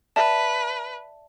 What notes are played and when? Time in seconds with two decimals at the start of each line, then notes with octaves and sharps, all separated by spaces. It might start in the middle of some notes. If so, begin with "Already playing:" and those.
0.16 B4 D5 E5 A5